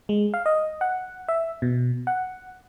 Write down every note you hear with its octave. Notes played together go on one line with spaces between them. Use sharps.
G#3
F5
D#5
F#5
E5
B2
F#5